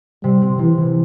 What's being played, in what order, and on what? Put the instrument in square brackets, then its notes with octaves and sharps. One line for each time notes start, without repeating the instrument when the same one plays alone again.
[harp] C3 [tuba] G3
[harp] C4
[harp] C3 [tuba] E3
[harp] E3